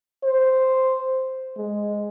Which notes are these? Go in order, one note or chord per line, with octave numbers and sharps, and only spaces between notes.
C5
G#3